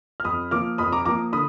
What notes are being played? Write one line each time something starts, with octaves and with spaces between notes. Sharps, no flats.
F6
F2 B5 D#6
F3 A#3 D6 F6
F2 B5 D#6
A#5 D6
F3 A#3 A#5 D6
D3 B5 D#6